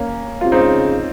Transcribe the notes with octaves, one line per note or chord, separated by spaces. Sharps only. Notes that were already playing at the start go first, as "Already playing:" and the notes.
Already playing: A#3 C#4
C3 F4
C#3 C4 D#4